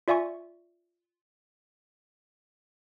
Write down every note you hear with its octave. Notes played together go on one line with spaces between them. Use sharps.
F4 D5 E5 G#5 C#6